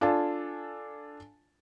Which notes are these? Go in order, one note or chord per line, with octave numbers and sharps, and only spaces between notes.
D4 F4 A4 G#5 A5